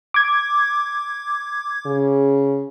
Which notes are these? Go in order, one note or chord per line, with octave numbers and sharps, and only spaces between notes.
D6 G#6
C#3